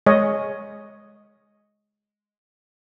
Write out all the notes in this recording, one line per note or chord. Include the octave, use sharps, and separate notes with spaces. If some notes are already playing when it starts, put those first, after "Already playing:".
G#3 C#5 D#5